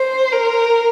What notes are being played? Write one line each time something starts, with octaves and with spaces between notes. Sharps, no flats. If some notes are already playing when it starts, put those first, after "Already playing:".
Already playing: C5
A#4